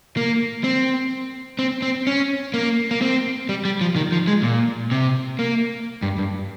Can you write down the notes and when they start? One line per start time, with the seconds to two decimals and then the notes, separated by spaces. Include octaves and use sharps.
0.17 A#3
0.64 C4
1.59 C4
1.82 C4
2.07 C#4
2.54 A#3
2.91 A#3
3.02 C4
3.49 G3
3.65 G3
3.81 F3
3.96 D#3
4.12 F3
4.27 G#3
4.44 A#2
4.92 C3
5.39 A#3
6.03 G2
6.18 G2